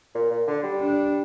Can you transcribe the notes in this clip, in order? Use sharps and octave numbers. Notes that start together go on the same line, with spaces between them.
A#2
A#2
D3
G3
D4